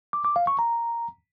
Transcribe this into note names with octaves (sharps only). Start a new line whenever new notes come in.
D6
D6
F5
C#6
A#5